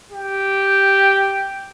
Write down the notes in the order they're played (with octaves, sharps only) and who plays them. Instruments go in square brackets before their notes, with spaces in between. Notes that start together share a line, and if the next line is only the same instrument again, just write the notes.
[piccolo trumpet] G4